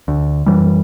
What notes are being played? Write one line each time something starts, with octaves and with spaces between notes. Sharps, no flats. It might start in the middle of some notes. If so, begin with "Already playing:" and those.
D2
F#2 E3 G3